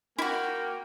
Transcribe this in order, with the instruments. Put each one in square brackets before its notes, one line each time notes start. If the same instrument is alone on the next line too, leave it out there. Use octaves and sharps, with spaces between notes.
[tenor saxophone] A#3 [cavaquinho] E4 F#4 [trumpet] G5